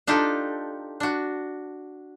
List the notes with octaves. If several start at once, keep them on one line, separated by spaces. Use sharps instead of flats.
D4 D#4 F4 G4 A4
D4 F#4